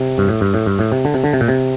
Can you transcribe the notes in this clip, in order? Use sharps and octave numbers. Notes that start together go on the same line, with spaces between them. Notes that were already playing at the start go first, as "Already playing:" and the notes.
Already playing: C3
G2
A2
G2
A2
G2
A2
C3
D3
C3
D3
C3
A#2
C3